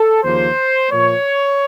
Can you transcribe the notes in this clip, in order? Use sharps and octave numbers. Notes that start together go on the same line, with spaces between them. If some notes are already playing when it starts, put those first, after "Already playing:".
Already playing: A4
D#2 C#3 F3 A#3 C5
A#2 F3 A#3 C#5